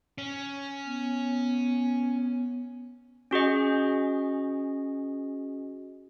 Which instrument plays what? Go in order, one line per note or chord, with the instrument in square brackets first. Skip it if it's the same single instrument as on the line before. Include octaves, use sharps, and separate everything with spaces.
[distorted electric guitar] C#4
[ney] B3
[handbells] C#4 F#4 G#4 D#5